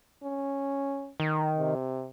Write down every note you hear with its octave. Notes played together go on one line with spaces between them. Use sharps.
C#4
D#3
C3